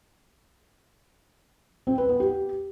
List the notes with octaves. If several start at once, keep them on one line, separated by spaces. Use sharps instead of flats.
C4
B4
B3
G4